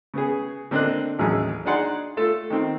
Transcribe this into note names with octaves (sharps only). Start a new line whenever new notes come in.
C#3 B3 G#4
D3 C4 D4 A#4 D#5 F#6
A1 D#2 E3 F#3 C#4 G#4
D4 D#4 G#4 D5 F#5 C6
A3 F4 A4
D#3 C4